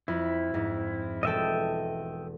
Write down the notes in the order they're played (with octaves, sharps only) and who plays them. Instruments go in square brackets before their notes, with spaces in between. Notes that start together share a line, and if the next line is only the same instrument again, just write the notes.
[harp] F2 [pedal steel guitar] E4
[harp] F2 G#2
[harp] E1 G#3 A4 [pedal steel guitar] D#5 E5 G5